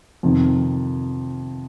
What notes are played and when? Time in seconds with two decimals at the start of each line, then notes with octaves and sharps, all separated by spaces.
0.23 F2 C3 D#3